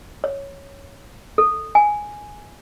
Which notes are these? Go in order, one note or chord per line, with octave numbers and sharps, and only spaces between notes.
C#5
A4
G#5